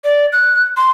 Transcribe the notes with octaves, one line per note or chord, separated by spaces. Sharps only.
D5
F#6
C6